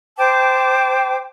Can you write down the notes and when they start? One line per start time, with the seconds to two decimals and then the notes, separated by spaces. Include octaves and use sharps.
0.18 C5 G5 A5 D6